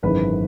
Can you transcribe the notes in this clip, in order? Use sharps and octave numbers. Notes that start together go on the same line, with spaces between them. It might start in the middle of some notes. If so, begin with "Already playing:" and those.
G#1 F#2 C#3 E3 B4 B5